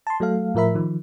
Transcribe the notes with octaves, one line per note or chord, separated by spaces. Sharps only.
A5 C6
F#3 A3 A4 F5
A2 F3 A#4 E5 B5
D#3 F3